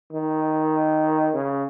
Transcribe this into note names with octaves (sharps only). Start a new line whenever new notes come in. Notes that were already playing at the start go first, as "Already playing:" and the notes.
D#3
C#3